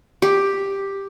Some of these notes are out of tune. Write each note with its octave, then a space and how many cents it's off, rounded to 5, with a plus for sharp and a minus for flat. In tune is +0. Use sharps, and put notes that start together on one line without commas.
G4 +5